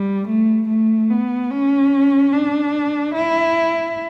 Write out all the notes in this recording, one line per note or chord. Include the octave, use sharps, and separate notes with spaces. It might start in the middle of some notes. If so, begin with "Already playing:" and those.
Already playing: G3
A3
A3
B3
C#4
D4
E4